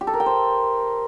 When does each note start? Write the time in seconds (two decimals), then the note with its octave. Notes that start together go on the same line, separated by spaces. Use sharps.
0.01 G4
0.07 A4
0.14 A#4
0.20 G5
0.26 C5